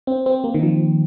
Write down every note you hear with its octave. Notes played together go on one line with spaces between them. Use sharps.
C4
C4
A#3
D#3
F3